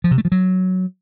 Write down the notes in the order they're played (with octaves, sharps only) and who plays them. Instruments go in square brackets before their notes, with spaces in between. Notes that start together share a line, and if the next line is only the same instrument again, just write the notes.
[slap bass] F3
C3
A3
F3
F#3